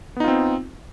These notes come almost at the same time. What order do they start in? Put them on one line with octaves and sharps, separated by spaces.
B3 D#4 F4 C4